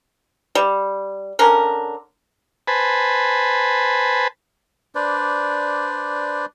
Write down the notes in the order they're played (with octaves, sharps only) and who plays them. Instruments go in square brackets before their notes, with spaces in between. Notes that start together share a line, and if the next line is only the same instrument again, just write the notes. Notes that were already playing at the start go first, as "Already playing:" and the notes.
[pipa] G3
D3 C#4 A#4
[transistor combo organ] B4 C5 G#5 A5 B5
[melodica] D4 B4 C5 D5